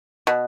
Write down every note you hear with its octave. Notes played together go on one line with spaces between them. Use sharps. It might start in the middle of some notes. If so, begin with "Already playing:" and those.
B2